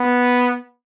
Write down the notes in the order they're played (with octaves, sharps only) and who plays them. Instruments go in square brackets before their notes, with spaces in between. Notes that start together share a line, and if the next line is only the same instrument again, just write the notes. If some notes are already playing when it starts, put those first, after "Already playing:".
Already playing: [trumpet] B3